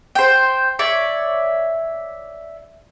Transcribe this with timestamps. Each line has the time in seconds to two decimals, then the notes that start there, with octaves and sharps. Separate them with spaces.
0.15 C5 G5
0.79 C#5 D5 E5